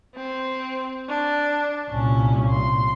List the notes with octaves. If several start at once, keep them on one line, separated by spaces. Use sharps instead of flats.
C4
D4
C2 A#2 C#4
C6